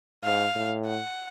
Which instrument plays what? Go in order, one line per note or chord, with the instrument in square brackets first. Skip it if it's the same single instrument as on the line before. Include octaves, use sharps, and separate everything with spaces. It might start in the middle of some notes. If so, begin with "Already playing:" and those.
[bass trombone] G#2 [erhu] F5
[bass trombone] A2
[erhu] F#5